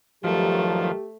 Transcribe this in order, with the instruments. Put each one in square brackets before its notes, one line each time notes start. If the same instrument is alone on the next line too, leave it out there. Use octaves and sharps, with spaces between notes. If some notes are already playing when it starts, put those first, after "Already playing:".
[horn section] G2 D#3 F#3 [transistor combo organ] F3 [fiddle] A3 [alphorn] G4